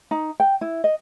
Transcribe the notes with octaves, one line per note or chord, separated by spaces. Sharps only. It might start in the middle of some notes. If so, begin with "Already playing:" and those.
D#4
G5
E4
D#5